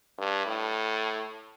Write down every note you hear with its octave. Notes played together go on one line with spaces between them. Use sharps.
G2
A2